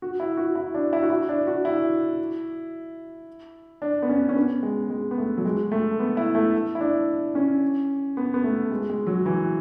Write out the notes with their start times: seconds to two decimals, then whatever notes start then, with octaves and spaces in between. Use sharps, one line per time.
0.02 F#4
0.20 E4
0.37 F#4
0.55 E4
0.74 D4
0.93 E4
1.03 F#4
1.10 E4
1.29 D4
1.47 F#4
1.65 E4
3.82 D4
4.02 B3
4.09 C#4
4.29 C#4
4.36 B3
4.63 G#3
4.90 G#3
5.11 B3
5.18 A3
5.37 F#3
5.45 G#3
5.72 A3
6.00 B3
6.17 E4
6.35 A3
6.75 E4
6.80 D4
7.35 C#4
8.17 B3
8.34 B3
8.44 A3
8.71 G#3
8.90 G#3
9.07 F#3
9.26 E3